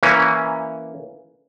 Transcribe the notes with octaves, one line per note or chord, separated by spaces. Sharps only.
E3 A#3 C#4